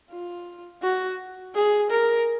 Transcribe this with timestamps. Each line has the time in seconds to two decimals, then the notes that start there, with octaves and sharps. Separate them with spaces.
0.11 F4
0.83 F#4
1.55 G#4
1.91 A#4